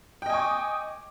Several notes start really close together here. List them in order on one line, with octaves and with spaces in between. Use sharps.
G5 D#5 G#5 C#6 D6